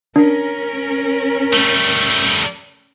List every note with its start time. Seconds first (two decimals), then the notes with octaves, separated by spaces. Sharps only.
0.16 C#4 D4 A#4
1.53 G3 A3